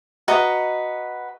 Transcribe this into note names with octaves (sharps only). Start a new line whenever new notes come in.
F#4 B4 D#5 A#5